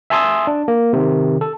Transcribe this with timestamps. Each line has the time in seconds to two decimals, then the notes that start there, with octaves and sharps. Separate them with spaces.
0.10 E5 G#5 A5 C6 D#6 E6
0.47 D4
0.68 A#3
0.93 C3 D#3
1.41 A4